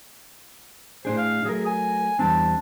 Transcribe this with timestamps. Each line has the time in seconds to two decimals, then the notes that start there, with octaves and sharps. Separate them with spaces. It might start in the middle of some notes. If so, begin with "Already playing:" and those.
1.05 A2 D4 G#4 C5
1.17 F5
1.45 F#3 A3 G#4 A#4
1.66 G#5
2.19 E2 G3 C4 D4